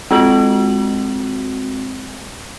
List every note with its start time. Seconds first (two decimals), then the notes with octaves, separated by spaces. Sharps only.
0.11 G#3 C4 F#4 F#7